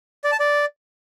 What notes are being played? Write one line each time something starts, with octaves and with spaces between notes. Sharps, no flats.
D5
A5
D5